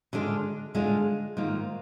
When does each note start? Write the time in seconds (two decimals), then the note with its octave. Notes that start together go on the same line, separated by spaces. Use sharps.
0.13 D3 G#3 D4 F4
0.75 D3 G#3 D4 F4
1.37 G#2 D#3 A#3 F4